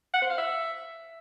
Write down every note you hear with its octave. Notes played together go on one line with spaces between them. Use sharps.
F#5
C5
F5
E5